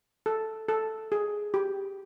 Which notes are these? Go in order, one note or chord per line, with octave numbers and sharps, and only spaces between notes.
A4
A4
G#4
G4